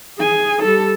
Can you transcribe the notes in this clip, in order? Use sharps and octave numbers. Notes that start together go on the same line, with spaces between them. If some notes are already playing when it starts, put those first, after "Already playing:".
G#4 G#5
G3 A4